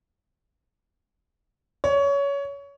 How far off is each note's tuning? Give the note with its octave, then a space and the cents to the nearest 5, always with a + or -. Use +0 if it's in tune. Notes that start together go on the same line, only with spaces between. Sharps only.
C#5 +20